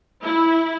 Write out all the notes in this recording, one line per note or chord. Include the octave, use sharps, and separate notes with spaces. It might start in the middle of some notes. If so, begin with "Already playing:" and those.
E4